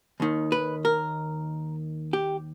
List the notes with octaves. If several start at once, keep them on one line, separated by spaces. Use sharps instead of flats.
D#2 D#3
B4
A#4
G4